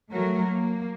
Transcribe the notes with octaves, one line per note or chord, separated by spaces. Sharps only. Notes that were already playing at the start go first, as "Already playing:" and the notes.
F#3 A3 F#4 A#4
A#3